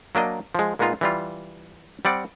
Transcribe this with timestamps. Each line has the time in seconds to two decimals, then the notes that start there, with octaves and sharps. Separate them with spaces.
0.15 F#3 A#3 D4 D#5
0.55 F3 G#3
0.79 A#2 G#3 B3 D#4 F4
1.01 E3 G3 F4
2.05 G3 C4 D5 F#5